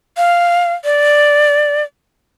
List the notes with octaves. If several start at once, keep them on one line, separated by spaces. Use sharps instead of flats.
F5
D5